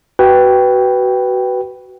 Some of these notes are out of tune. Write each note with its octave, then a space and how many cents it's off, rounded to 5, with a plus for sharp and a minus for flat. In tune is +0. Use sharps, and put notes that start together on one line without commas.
F#4 +20 B4 +0 G5 +0